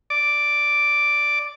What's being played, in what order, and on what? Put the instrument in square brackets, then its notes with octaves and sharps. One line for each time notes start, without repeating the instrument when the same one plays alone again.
[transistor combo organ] D5 D6